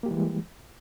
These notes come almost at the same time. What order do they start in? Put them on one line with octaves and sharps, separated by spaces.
A#3 G4 G3 E3 G#3